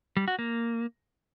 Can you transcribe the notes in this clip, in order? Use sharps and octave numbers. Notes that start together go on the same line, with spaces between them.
G3
F#4
A#3